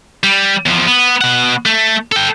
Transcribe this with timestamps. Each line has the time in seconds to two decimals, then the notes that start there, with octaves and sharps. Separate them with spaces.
0.23 G3
0.66 E2 F3
0.87 B3
1.21 B2 F#5
1.66 A3
2.12 A4 G5